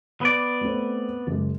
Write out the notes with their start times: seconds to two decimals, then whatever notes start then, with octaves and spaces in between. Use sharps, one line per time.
0.21 B3 B4 D5
0.61 A3 C4
1.27 F#1 G#3